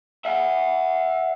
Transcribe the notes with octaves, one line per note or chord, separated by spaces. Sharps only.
E5 F#5